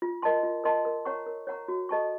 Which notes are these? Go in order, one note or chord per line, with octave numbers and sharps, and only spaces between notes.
F4
A#4 D#5 A5 C6
F4
A#4 D#5 A5 C6
A#4
C#5 F#5 A#5 C#6
A#4
C#5 F#5 A#5 C#6
F#4
A4 D#5 A5 C#6